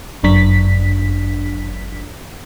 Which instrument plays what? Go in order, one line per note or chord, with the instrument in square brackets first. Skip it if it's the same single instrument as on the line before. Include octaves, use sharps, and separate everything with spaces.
[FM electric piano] G1 F#2 D4 B6